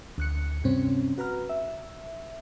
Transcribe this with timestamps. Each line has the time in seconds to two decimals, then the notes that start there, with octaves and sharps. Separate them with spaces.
0.18 D2 F#6 C#7
0.64 G2 C3 C4 C#4
1.18 F#4 B4 A#5 F6
1.49 E5